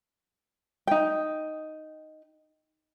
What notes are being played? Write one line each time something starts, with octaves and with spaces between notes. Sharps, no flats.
D#4 G5